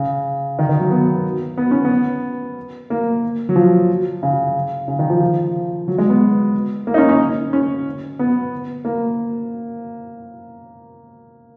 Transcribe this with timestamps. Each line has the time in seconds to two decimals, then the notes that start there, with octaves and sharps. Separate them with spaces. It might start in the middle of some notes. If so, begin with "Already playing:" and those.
Already playing: C#3
0.59 D#3
0.69 D#3
0.80 F#3
0.92 B3
1.58 B3
1.71 C#4
1.85 B3
2.90 A#3
3.49 F#3
3.56 F3
4.23 C#3
4.88 C#3
4.99 D#3
5.10 F3
5.88 F#3
5.98 G#3
6.09 B3
6.87 A#3
6.94 D#4
6.98 C#4
7.09 C#4
7.53 C#4
8.19 B3
8.85 A#3